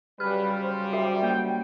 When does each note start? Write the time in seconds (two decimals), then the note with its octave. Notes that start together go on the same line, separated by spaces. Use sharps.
0.20 C#3 F#3 G3 B4 F6
0.63 C5
0.93 F#4 E5
1.23 A#3 G5